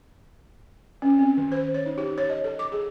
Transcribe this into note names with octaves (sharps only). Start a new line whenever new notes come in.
C#4
C4
D#3
C5
C#5
D#4
G4
C#5
D#5
A4
D6
G#4